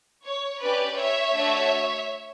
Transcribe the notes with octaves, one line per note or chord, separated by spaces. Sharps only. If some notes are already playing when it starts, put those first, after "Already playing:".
C#5
C#4 G4 B4 D5
C#5 E5
A3 D4 F#4 A4